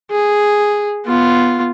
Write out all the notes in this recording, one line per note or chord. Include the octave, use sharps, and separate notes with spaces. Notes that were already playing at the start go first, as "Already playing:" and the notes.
G#4
B3 F4